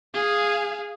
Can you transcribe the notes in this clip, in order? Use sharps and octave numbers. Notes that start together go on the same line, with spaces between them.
G#4 F5